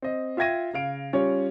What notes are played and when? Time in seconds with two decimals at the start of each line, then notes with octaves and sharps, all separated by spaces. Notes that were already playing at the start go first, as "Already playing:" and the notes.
0.02 C4 D#5
0.37 F4 E5 G5 G#6 A#6 D#7
0.73 C#3 F5 D7
1.13 G3 C#4 F4 C#5